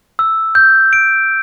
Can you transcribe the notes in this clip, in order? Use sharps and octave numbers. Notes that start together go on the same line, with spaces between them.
E6
G6
D7